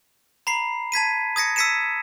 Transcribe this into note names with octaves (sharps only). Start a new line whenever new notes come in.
A#5 B5 C7
A5 G#6 B6 D#7
D#6 G#6 A#6 C#7
E6 G#6 B6 C#7 D#7 E7